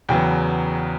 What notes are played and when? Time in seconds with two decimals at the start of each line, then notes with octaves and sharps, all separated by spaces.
0.09 E2 C#3 F#3 B3 G5